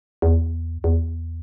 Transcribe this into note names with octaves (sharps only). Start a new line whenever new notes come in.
E2
E2